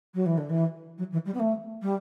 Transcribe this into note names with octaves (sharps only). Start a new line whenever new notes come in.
F#3
E3
D3
E3
F#3
E3
G3
B3
A3
G3